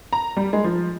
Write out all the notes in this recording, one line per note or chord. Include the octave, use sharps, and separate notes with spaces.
A#5
G3
G#3
F3